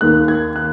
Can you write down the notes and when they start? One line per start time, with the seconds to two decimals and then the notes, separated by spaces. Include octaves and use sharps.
0.01 D#2 D#3 A#3 F#6
0.28 G#6
0.56 F#6